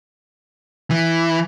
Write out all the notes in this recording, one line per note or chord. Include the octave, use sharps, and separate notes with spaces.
E3